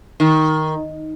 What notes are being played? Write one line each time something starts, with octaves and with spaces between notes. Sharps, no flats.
D#3